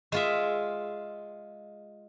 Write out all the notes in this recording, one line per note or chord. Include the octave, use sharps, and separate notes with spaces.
G#3 F4 E5